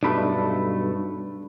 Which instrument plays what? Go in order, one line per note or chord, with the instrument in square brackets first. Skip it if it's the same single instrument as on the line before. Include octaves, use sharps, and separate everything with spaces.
[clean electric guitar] B1 G2 A3 [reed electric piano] D4 B5